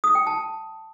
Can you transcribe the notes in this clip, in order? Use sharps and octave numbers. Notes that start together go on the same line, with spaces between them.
D#6
G5
A5